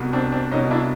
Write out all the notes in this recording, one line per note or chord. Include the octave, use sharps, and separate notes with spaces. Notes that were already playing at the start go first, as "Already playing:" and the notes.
Already playing: C2 B2
C4 D4
C4 D4
C2 B2 C#4 D#4
D4 E4